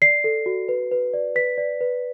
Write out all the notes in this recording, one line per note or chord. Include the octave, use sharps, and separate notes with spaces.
D5 C7
A4
F#4
B4
B4
D5
B4 B6
D5
B4